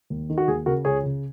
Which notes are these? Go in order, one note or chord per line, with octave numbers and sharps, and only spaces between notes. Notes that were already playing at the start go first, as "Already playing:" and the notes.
D#2
D#3
F#4
D#2 G#4
C#3 F#4 A#4
C#2 G#4 C#5
C#3